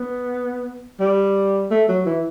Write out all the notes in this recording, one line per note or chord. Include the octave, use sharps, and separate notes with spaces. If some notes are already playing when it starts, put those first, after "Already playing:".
Already playing: B3
G3
A3
F#3
E3